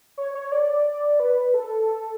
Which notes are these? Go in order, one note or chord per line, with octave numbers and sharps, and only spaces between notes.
C#5
C#5
D5
B4
A4